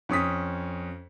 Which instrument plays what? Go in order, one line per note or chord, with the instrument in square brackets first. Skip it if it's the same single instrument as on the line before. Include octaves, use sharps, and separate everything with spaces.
[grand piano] F2 C#4 D#6 B6